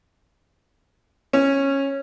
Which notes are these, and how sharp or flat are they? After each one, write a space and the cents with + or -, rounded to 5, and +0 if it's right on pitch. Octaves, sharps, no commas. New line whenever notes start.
C#4 -15